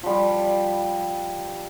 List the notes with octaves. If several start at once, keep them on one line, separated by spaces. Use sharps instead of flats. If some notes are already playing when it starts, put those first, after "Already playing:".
F3 G3